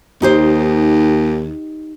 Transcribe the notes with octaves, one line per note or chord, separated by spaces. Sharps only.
D#2 D#4 G4 C5